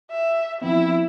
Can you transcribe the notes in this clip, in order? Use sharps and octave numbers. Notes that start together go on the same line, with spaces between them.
E5
F3 B3 C4 E4